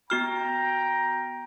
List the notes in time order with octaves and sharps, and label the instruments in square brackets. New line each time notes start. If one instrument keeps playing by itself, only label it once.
[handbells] B3 F#4 F6 [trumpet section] G5 A#5